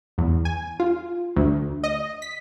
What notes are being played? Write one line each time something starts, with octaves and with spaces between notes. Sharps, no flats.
E2
G#5
F4
D2
D#5
B6